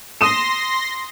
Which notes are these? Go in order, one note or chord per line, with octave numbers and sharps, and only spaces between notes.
C6 D#6 A#6 D#7 E7